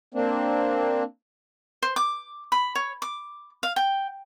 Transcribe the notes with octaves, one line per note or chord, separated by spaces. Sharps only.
A#3 C4 D4
C5
D6
B5
C#5
D6
F5
G5